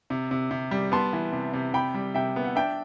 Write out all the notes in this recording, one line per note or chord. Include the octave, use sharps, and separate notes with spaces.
C3
C3
C3
G3
B3 A5 C6
E3
C3
C3
C3 G5 B5
G3
C3 E5 G5
B3
F#5
D4 E5 G5